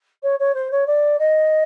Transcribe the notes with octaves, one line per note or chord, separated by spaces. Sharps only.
C#5
C#5
C5
C#5
D5
D#5